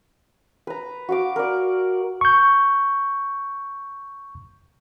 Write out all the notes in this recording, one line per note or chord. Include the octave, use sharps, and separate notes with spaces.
B4 A#5
F#4 F5 D6
A#4 D5
C#6 G6